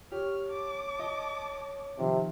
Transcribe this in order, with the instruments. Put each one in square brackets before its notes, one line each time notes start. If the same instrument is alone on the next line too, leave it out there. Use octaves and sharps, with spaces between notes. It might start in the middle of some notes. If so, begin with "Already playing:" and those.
[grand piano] G4 [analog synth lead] C#5 [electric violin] F6
[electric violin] A5 D6
[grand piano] D#5
[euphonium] C3 [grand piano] D#3 [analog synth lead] F3